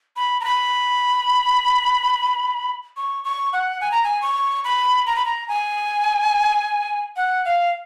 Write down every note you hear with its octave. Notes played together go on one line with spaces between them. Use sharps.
B5
A#5
B5
C#6
C#6
F#5
G#5
A#5
G#5
C#6
B5
A#5
B5
A#5
G#5
F#5
F5